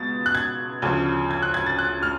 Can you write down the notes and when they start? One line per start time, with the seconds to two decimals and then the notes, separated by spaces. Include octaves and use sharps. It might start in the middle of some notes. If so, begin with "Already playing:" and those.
Already playing: C#2 B2 A6
0.26 F#6
0.35 G#6
0.82 D2 C#3 F3 G#6
1.31 G#6
1.43 F#6
1.54 G#6
1.66 A6
1.79 F#6
2.03 F6